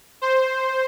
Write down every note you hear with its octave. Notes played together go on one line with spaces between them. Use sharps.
C5